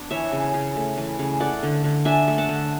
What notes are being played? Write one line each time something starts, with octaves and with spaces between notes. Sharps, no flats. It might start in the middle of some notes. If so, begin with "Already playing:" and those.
Already playing: B3 D4
E3 C#5 E5
C#3
C#3
A3
E3
C#3
A3 D5 F#5
D3
D3
D4 E5 G#5
A3
F#5 A5
D3